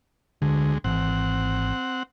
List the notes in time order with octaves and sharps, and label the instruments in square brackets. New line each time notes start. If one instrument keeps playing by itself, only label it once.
[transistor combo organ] D2 G#3 [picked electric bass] D3
[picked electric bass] G#1 E3 [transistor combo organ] C4 F#5